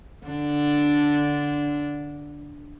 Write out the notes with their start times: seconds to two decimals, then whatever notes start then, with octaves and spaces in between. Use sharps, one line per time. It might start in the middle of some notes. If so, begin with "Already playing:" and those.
0.27 D3 D4